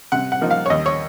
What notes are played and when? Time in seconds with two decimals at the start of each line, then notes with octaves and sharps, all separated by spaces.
0.12 C3 F#5
0.32 F#5
0.41 F3 A#3 D#4
0.51 F5
0.66 C#5
0.70 D#2 D#5
0.86 C#5